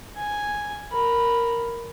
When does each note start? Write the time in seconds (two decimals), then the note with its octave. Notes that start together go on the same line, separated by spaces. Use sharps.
0.17 G#5
0.92 A#4 B5